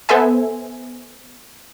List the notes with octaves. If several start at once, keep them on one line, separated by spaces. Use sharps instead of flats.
B3 A4 C5 E5 G#5